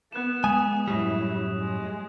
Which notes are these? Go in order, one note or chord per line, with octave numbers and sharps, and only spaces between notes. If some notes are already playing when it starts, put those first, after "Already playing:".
B3 F#6 E7
G#3 G#5 D#6
F#2 A2 G3 E4
G#3